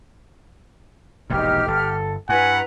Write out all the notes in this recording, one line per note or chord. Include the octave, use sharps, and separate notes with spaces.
E1 A#1 G#2 D#4 G4 F6
G1 A4
G2 E4 B4 F#5 G#5 A#5